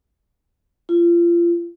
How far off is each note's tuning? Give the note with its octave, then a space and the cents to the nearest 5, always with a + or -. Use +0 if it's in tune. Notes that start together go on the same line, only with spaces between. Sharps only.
F4 -30